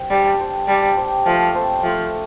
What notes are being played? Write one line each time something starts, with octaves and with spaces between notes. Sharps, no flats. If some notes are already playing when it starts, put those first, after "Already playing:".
Already playing: G4 C5
G3 D4
G4 C5
G3 D4
G4 C5
F3 A3
C4 A4 C5
F3 A3